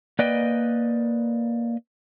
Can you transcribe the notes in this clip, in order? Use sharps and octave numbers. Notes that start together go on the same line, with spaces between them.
A#3 B4 D5 D#5 G5